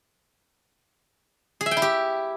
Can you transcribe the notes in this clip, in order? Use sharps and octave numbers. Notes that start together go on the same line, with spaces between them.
G#4
E5
G5
E4
G4